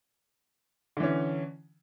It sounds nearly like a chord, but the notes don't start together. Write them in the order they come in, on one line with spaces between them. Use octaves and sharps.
D3 E3 C#4